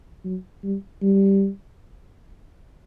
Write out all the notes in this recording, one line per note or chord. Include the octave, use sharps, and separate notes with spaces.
F#3
G3
G3